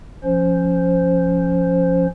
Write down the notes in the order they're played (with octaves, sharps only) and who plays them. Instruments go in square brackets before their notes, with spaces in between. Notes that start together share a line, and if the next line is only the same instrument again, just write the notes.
[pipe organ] F3 C#4 C5